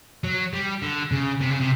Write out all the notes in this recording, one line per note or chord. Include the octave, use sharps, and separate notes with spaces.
F#3
G3
D3
C#3
C3
C#3
C3